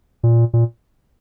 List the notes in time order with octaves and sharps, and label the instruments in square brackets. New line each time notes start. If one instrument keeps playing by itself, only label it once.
[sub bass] A#2
A#2